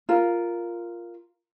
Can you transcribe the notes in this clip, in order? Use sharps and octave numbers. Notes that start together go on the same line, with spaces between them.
F4 A#4